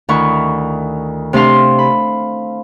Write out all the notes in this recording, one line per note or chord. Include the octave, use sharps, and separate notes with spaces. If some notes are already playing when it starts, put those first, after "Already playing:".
D2 D#3 E4 C#6
C3 A3 D4 F5 C6
B5